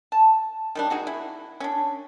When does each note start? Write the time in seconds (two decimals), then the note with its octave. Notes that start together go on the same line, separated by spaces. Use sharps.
0.12 A5
0.75 D#3 G3 D4
0.90 D#4 F#4 G#4
1.07 E4
1.60 C#4 D4